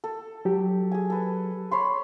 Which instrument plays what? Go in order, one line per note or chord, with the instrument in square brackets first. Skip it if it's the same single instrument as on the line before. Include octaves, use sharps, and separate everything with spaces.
[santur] A4
[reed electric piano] F#3 G4
[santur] G#4 G#5
A4 B4
C#5 B5 C6